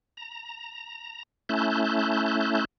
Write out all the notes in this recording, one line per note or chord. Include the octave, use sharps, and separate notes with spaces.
A#5
A3 C#4 E4 A5 F#6 G6